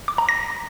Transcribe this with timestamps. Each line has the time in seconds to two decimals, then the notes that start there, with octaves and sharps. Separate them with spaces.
0.08 D6
0.18 A#5
0.29 A#6